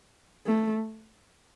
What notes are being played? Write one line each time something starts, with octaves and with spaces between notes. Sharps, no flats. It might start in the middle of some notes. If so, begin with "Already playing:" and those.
A3